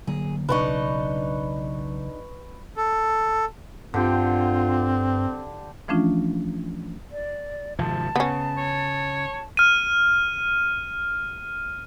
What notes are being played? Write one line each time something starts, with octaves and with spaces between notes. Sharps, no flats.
D3 F#3 A#3 G#4
B1 C#3 D4 D#4 B4 D#5 C#6
A4
G2 D3 C4 F4 G4
E3 F3 A3 C#4 D4 F4
D5
G#1 C3 F3 A5
C#3 B3 C#4
C#5
F6 D#7